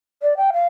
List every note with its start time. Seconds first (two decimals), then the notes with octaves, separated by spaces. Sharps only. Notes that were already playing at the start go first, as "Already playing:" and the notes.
0.22 D5
0.37 G5
0.53 F5